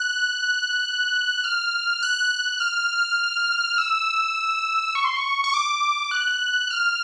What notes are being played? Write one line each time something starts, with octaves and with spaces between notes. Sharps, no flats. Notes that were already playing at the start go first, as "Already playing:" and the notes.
Already playing: F#6
F6
F#6
F6
E6
C#6
C6
C#6
C#6
D6
F#6
F6